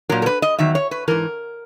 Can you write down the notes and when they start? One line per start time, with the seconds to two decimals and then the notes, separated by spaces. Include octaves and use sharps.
0.09 A#2 F#3 A#4
0.22 A#4
0.26 B4
0.42 D#5
0.59 E2 D#3 F#3 E5
0.75 C#5
0.91 B4
1.08 G#2 E3 A#4